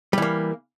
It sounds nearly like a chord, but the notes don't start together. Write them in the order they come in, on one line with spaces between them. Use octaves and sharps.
G3 E3 A#3